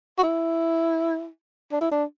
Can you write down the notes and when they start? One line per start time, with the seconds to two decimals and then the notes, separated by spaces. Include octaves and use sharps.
0.19 F#4
0.23 E4
1.72 D4
1.81 E4
1.92 D4